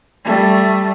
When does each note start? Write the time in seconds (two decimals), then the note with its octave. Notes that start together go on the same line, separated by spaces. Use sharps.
0.25 G3 A3